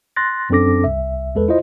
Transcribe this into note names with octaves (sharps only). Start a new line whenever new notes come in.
C6 F#6 A6 A#6
F#2 C4 D4 A4 D6 A#6
C2 E5
E2 G#3 A4 B4
E4 F4 C5 D#5